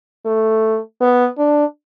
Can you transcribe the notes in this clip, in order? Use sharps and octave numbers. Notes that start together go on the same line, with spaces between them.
A3
B3
D4